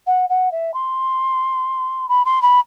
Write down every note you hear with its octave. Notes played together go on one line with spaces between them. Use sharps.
F#5
F#5
E5
C6
B5
C6
B5